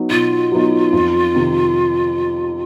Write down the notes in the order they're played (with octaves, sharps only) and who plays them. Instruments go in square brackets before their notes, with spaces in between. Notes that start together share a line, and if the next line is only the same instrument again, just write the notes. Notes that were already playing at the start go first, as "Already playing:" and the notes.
Already playing: [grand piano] F#3 B3 D#4
[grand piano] B2 [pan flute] F4
[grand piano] F#3 B3 D#4
F2
C3 D#3